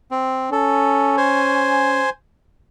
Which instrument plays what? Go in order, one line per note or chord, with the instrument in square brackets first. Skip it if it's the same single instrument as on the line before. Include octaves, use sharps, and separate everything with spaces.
[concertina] C4
[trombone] C#4 [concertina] A4
[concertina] C5 G#5